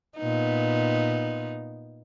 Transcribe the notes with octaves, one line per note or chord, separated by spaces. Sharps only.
A#2 B3 D#4